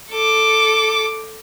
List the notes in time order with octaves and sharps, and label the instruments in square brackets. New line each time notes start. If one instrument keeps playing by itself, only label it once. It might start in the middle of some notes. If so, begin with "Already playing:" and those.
[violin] A4 D6